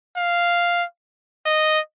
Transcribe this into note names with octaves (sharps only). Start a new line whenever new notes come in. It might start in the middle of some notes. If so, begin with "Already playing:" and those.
F5
D#5